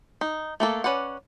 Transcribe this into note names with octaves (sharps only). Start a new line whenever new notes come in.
D#4
A3 A#3 A4
C#4 B4 D5 F#5